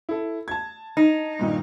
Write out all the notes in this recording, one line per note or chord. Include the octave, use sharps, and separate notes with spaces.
E4 A4
A5 G#6
D#4
G2 A#2 D#3